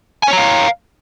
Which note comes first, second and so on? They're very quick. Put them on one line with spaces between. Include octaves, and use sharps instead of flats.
G#5 C#5 A#5 F5